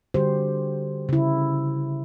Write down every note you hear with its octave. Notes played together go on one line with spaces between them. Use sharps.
D3 G3 F#4 G4 C5
C#3 E4